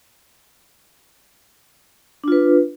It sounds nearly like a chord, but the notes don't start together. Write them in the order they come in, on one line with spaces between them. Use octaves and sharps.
D4 F4 B4